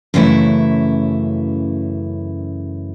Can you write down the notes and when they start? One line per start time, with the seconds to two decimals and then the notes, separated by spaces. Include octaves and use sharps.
0.14 F#2 C#3 E3 A3 E4